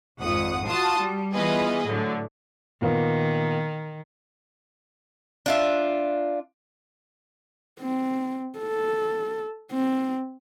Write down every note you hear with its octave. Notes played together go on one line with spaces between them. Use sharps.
G#1 F2 F#5 D#6
F4 F#4 A5 C6 D#6
G3
E3 B3 F4 G#4 B4 D#5
A2 D3 F#3
A#2 D#3 A#3 B3
D4 F4 E5
C4
A4
C4